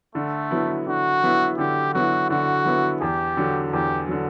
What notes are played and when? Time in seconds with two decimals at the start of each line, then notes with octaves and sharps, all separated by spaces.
0.15 D3 A3
0.51 F#3 B3 E4
0.87 D3 F#4
1.23 F#3 B3 E4
1.58 D3 G4
1.94 F#3 B3 E4 F#4
2.30 D3 F#4
2.65 F#3 B3 E4
3.01 E2 G4
3.37 D3 F#3
3.72 E2 G4
4.08 D3 F#3